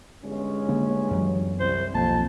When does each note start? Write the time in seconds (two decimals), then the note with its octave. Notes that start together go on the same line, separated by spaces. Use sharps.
0.24 G1 G#3 C#4
0.69 D3 A#3 D4
1.11 F#2 E3 F#3
1.60 C2 C5
1.95 D#1 B1 F2 A#3 A5